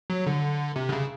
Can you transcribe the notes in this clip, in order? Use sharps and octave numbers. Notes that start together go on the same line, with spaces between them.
F#3
D3
C3
D3
C#3